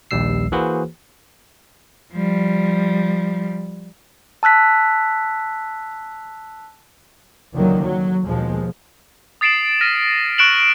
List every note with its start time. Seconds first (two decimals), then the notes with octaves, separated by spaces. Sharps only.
0.11 A#1 D#2 G3 E6 C7
0.52 E3 A#3 F#4 G#4 B4 C5
2.14 F3 G3
4.43 A5 E6 F#6 B6
7.53 C#2 D3 D#3 F#3 A#3
7.83 F#3
8.26 D#2 B2 F3 G#3
9.41 D#6 A6 C7 D7 E7 F#7
9.81 F6 A#6 B6 D#7
10.38 C#6 F#6 D7 E7 F#7